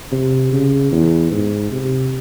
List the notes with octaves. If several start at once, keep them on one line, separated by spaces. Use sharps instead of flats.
C3
C#3
E2
G#2
C3